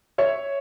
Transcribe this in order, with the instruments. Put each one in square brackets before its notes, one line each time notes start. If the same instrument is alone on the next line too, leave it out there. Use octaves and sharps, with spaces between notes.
[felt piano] C#5 E5